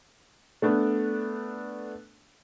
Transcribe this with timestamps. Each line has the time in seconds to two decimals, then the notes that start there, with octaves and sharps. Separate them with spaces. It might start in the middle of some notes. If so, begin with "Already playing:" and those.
0.62 A3 B3 D4